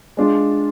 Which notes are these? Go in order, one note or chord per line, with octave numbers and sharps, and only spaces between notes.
G#3 D4 F4